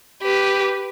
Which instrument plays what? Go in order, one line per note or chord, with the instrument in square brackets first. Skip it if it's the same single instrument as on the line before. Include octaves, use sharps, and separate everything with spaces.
[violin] G4 B4